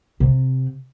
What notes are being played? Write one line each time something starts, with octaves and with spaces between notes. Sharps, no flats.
C3 C4